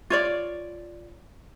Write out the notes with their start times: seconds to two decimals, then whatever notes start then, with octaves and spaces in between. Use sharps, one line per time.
0.10 F4 C#5 D5